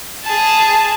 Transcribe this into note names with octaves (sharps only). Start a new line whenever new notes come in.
G#4 A5